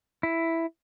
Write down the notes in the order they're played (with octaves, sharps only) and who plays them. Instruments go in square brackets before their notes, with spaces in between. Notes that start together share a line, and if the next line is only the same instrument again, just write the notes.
[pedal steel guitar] E4